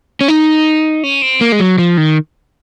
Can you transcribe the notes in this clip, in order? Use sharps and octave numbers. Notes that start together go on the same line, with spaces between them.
C#4
D#4
C#4
C4
A#3
G#3
F#3
F3
D#3